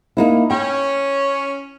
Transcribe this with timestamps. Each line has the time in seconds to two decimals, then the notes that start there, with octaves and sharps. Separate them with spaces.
0.17 A#3 D#4 E4
0.51 C#4 G5